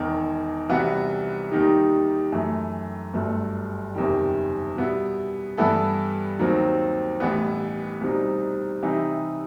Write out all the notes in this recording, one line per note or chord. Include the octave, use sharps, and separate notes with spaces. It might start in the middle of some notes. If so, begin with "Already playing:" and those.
Already playing: E1 E2 D#3
C2 C3 E3 B3 F#4
D#2 D#3 G3 D#4 G4
F#2 E3 A3
G1 G2 F#3 A3
F#1 E2 C3 D#3 G3
B2 G3 B3 E4
G2 E3 B3 E4 A4
D#2 D#3 F#3 C4
A1 A2 E3 G3 B3
C2 B2 G3 C4 D#4
C3 E3 G3 D#4